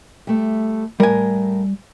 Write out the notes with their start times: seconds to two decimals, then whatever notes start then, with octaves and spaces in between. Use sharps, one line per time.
0.27 G3 A3
1.00 A2 G3 A#4 G#5